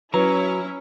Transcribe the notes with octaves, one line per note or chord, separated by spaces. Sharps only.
F#3 C#4 E4 B4 C#5 A#5